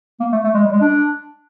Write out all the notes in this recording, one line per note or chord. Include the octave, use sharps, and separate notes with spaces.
A#3
A3
A3
G#3
G3
G#3
D4